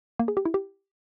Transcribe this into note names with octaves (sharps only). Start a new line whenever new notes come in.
A#3
G#4
G4
E4
G4